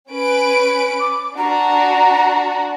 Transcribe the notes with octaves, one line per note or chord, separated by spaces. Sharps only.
C#4 B4 D7
D6
D4 F#4 A#5